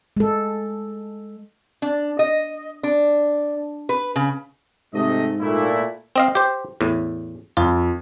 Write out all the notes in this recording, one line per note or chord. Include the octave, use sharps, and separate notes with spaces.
G#3 A4
D4
D#5
D4
B4
C#3
G#2 C3 A3 D#5
A#2 A3 E4
C4 D#5 F5
G4 C5
E2 A2
F2 F4